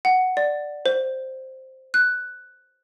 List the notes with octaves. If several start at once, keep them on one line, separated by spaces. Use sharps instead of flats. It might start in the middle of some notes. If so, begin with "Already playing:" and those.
F#5
D5
C5
F#6